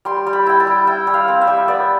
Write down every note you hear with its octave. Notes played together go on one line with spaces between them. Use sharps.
G3 C6
G3
B5
E4 G5
A5
G3
E4 G5
G3
F5
C4
E5
G3
B3 D5